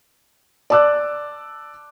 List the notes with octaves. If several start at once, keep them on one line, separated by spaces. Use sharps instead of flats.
D5 A5 D6 E6 F#6